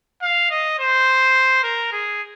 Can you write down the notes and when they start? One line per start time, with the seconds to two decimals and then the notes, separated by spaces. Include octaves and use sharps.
0.22 F5
0.50 D#5
0.79 C5
1.63 A#4
1.92 G#4